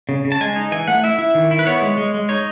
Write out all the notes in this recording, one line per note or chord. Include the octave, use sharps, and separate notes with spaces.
C#3
C#3
A5
G#3 G#5
D#4
E3 G#5
A3 F#5
E4 E5
E4
D#3
E4
B4
B3 C#5
G#3
G#3
G#3
D#4 C#5